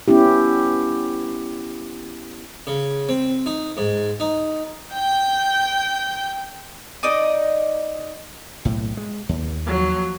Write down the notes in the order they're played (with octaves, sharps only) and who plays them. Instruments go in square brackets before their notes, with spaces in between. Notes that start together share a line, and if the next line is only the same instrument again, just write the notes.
[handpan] B3 C#4 E4 G4
[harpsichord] C#3
C4
D#4
G#2
D#4
[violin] G5 G6
[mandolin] D#4 D5 D#5 D#6
[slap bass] B1 A2
G#3
D#2
[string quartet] F3 F#3